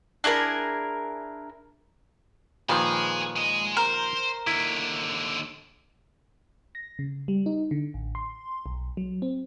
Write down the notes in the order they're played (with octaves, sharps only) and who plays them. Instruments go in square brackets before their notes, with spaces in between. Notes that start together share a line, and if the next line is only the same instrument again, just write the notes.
[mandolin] D4 E4 G#4 A#4
[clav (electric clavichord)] A#2 D#3 F3 [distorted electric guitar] G#3 G#4 [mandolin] B4
[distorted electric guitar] G#3 D#5
[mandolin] A#4 [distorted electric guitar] C5
[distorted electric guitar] D#2 D3 [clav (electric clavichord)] E4
[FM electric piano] A#6
C#3
G3
D#4
D3
A1
C6
B1
F#3
C4